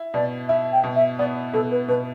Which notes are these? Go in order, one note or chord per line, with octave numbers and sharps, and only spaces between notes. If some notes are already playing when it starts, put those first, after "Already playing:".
Already playing: E4
B2 D5
E4 E5
G5
B2
E5
B3 D5
B2 A4
B4
B2 B4